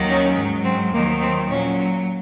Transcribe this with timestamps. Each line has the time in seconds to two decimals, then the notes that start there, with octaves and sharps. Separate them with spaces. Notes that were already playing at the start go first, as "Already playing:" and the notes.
Already playing: D#2 D#3 F#3
0.08 C#4
0.37 G#2 F#3
0.65 C4
0.93 D#2 D#3 F#3 A#3
1.21 C4
1.50 A#2 F#3 C#4